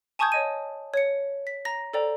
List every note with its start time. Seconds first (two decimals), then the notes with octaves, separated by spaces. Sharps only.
0.19 G#5 A5 C#6 D#6 G6 G#6
0.32 C#5 D#5 D#7
0.94 C#5 C#7
1.47 B6
1.65 A#5 A#6
1.94 A4 C5 D5 G5 A#5